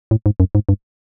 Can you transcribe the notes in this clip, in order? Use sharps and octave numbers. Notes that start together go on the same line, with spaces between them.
A2
G#2
F#2
G#2
G2